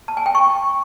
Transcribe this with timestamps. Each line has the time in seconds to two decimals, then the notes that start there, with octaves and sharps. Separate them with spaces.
0.08 A5
0.17 G#5
0.26 G5
0.35 C#6